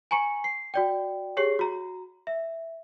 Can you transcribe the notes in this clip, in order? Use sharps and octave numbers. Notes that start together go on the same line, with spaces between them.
G#5 A#5 C#6 C#7
C7
F#4 D5 G5
G4 G#4 C#5 C7
F#4 A#5
E5